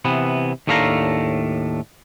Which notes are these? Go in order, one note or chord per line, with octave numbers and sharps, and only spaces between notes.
C3 E3 B3
D#2 A2 A3 D4 F5 A#5